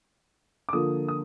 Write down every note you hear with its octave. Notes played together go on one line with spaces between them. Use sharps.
D6
D3 F3 A#3 F4 D#6
D#6